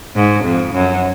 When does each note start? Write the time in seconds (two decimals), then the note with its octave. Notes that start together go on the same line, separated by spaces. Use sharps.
0.15 G#2
0.44 F2
0.74 F#2